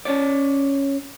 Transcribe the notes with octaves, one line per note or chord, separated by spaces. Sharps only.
C#4 C#5 D5